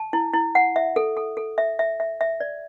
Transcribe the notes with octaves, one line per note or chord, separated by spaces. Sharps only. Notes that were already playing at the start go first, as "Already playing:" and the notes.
Already playing: A5
E4
E4
F#5
E5
A4
A4
A4
E5
E5
E5
E5
D5